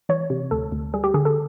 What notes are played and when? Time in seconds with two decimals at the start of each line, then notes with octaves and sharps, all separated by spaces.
0.09 E3 C#5
0.30 C3
0.51 D2 A4
0.72 D2
0.94 G3 G#4
1.04 G4
1.14 D3 G#4
1.25 A4